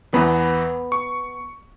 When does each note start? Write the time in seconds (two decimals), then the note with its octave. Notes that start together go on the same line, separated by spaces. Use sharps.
0.14 E2 E3 B3
0.92 C#6